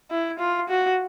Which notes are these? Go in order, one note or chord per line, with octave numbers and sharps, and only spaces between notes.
E4
F4
F#4